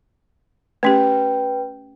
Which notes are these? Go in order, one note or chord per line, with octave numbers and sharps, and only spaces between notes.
A3 C#4 G4 B4 G5